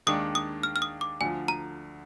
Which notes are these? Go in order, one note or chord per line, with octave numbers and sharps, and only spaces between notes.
D#2 D#3 G#3 D4 D#6
D#6
F6
F6
D#6
D6
D2 D3 F3 G#5
A#5